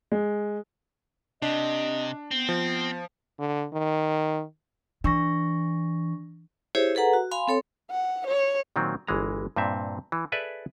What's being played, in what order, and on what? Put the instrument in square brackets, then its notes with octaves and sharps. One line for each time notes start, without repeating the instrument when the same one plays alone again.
[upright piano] G#3
[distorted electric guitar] C3 [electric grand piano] D4 [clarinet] D#5
[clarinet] B3 [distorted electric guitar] C4
[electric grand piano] F3
[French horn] D3
D#3
[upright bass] E3 [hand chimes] D4 C#6 A#6
[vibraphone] E4 G4 G#4 C5 C#5 E5
G#4 A4 B4 F#5 A#5
F#4
F5 G#5 B5 C6
C4 A4 C#5 C6
[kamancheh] F#5
C#5
[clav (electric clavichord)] A#2 D#3 F#3 C4
G1 E3 G#3 A#5
G2 A#2 C4 E5
E3
G#4 A4 B4 D5 E5